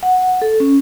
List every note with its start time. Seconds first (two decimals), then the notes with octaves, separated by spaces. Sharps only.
0.03 F#5
0.42 A4
0.60 C#4